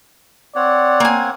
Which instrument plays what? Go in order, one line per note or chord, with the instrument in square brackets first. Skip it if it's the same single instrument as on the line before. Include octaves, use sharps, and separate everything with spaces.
[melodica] C4 C#5 F#5 [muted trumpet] D5
[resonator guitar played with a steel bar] A#3 G#5